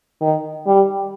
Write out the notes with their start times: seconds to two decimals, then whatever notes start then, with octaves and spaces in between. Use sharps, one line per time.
0.21 D#3
0.66 G3